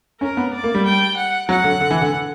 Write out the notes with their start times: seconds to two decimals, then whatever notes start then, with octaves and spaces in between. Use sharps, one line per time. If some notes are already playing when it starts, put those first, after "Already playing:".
0.21 C#4 A#4
0.37 B3
0.54 D5
0.64 A#3
0.74 G3
0.85 G5
1.17 F#5
1.49 F#3 F#5
1.64 D3
1.80 D3
1.91 E3
2.01 D3